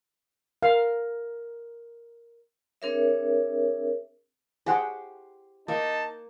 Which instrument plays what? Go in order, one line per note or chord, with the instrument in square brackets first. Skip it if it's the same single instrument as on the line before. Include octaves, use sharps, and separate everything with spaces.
[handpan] A#4 [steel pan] F5
[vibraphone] C4 D4 G#4 A#4 C#5 E5
[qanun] G4 C5 [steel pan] G#4 F#5 G5
[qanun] A#3 [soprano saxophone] D#4 [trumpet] A5